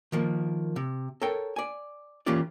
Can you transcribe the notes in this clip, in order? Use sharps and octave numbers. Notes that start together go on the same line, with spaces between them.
D#3 F3 A#3
C3
A4 A#4 C#5 G5
D5 G#5
E3 A#3 C#4 F4 G4 D5